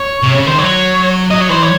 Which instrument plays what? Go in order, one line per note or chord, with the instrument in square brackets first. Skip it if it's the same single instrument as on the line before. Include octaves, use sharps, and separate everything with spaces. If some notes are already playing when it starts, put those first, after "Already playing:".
Already playing: [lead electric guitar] C#5
[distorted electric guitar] C3
C#3
[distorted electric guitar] D#3 [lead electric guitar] C5
[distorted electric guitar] F#3 [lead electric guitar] C#5
[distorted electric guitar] F#3 [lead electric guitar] D#5
[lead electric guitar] C#5
[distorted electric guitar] E3 [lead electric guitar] C5
[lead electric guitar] C#5